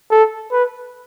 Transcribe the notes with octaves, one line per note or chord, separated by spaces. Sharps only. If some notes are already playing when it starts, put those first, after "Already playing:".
A4
B4